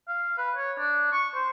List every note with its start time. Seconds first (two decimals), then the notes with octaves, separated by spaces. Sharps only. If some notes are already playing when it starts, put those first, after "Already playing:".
0.08 F5
0.38 B4
0.56 C#5
0.78 D4
1.13 C#6
1.35 C5